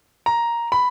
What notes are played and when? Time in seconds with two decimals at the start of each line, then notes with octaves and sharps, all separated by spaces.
0.26 A#5
0.72 B5